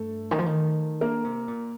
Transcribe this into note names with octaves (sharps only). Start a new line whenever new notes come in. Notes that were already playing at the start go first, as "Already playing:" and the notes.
Already playing: G2 A3 A4
D#3
F3
D#3
D3 A#3 A#4
C3
A#2